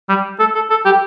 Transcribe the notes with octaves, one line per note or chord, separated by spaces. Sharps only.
G3
A4
A4
A4
G4